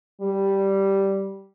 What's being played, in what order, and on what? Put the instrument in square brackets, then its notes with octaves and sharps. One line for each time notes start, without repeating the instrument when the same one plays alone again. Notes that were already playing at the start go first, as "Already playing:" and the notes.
[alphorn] G3